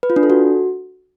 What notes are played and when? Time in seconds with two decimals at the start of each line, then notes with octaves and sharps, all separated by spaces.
0.03 B4
0.10 F4
0.16 D4
0.23 A4
0.30 F#4